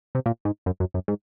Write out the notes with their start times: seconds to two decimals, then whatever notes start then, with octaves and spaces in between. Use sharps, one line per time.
0.15 C3
0.26 A#2
0.45 G#2
0.66 F#2
0.80 F#2
0.94 F#2
1.08 G#2